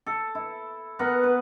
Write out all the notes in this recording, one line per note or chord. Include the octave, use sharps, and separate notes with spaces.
A4
E4
B3 A#4 F#5
B4